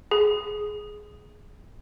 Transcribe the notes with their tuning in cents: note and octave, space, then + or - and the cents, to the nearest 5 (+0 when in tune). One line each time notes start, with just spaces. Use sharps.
G#4 +10